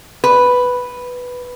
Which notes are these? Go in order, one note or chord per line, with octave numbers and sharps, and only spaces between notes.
B4